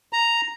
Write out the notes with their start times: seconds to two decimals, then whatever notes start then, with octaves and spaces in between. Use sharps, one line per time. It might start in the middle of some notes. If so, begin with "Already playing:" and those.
0.13 A#5